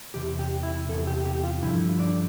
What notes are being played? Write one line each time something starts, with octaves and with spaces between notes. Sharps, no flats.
E2 C3 G4
G4
E4
E2 C3 A4
G4
G4
F4
G2 D3 F3 E4
D4